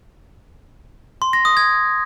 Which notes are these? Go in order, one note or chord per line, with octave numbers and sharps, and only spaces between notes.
C6
A#6
D#6
G#6